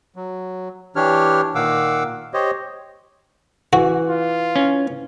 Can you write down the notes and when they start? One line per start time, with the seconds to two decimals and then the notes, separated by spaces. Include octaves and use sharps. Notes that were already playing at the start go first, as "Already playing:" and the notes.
0.16 F#3
0.96 E3 D4 G4 C#5 F6
1.55 A#2 D#3 F5 F#5 D6 E6
2.34 G4 C5 C#5 D#5
3.73 E3 F#4
4.09 F4
4.56 C#4